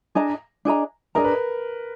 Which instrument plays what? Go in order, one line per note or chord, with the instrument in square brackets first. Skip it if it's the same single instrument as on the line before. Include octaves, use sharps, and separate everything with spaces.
[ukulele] D4 G#4 D#5 A#5
D4 G#4 D#5 A#5
[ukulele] D4 G#4 D#5 A#5 [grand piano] A#4
[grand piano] B4